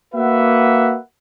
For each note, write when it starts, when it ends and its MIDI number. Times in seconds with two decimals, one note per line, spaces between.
0.14 0.97 58
0.14 0.97 66
0.14 0.97 71
0.14 0.97 76
0.14 0.97 78